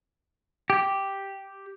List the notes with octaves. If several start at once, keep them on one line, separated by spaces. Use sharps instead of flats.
G4